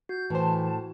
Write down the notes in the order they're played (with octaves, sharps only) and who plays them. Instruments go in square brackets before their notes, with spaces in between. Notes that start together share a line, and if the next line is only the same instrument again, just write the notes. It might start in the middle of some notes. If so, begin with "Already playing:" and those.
[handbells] F#4 [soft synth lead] G6
[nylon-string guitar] A2 C5 [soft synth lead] E3 [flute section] A5